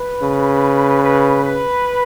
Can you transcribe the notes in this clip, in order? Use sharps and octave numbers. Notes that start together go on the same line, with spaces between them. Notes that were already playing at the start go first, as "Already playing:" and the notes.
Already playing: B4
C#3
B4
B4